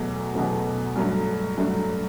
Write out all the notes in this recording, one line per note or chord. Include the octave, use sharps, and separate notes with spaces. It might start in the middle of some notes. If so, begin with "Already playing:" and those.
Already playing: E2 B2 F#3 A3
E2 B2 F#3 A3
G2 F#3 A3
G2 F#3 A3